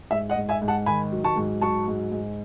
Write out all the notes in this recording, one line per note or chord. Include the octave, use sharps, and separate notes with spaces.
G#2 E5
D#5 F#5
G#2
E5 G#5
G#2
F#5 A5
D#3 G#5 B5
F#3
A5 C#6
G#2
F#3 A5 C#6
G#2
G#2